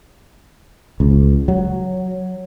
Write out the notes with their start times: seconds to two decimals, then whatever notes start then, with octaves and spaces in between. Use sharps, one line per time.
1.00 C#2
1.48 F#3